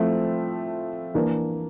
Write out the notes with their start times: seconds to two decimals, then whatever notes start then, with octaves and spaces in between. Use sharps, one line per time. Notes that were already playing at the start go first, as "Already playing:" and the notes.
Already playing: F3 A3 C4 E4
1.14 E3 A#3 D4